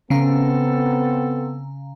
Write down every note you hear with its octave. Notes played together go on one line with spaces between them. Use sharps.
C#3 B3 C4 A4 F5 A#5